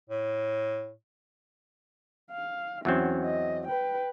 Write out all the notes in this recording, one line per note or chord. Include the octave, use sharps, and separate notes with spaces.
A2
F5
E2 F#3 C4 C#4
D#5
B4 G5